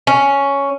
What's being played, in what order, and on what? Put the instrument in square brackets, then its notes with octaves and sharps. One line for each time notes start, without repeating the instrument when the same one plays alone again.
[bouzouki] C#4